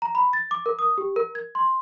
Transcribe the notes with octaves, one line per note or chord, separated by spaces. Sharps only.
A#5
B5
A6
D6
A#4
D#6
G4
A#4
G#6
C6